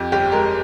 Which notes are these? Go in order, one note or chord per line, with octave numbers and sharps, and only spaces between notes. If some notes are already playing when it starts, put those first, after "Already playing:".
Already playing: F2 G4
G1 G4
G#3 A#4